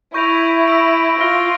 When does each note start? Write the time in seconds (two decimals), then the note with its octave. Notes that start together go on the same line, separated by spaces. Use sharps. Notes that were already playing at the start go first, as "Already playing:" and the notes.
0.14 E4 C#6 G6 A#6 D7 F7
0.68 E6 A#6 D7
1.20 F4 F6 A#6 D7 G7